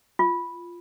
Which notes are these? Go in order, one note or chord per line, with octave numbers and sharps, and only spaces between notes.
F4